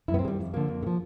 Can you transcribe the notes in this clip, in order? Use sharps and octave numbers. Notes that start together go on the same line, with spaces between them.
F#2 E4
B3
C4
D#3 G3 G#3
F2
D3 F3 A#3
F2
D3
F3